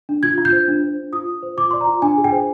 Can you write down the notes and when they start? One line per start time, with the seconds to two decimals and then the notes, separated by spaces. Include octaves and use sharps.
0.09 D4
0.23 F4 G#6
0.38 F4
0.45 G6
0.53 C5
0.68 D4
0.83 C5
0.98 D4
1.13 F4 D#6
1.27 F4
1.43 C5
1.57 F4 D6
1.71 D5 C6
1.81 A#5
1.87 F4
2.02 D4 G#5
2.18 G#4
2.24 G5
2.32 C5